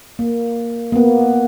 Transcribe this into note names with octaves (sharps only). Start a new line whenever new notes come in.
A#3
A#3
B3